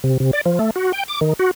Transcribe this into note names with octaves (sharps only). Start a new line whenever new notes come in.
C3
C3
D5
F3
A3
F#4
G5
D6
D#3
F#4